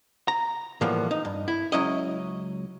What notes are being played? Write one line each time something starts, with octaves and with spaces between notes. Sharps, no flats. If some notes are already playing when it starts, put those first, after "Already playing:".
A#5
A2 E3 F3 G3 A#3 B3
D#4
G2
E4
C#2 A2 F#3 C#4 E4 D#5